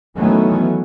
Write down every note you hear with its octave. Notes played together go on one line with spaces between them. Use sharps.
D#3 E3 F#3 A3 B3 C#4